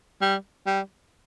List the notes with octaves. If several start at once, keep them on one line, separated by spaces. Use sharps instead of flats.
G3
G3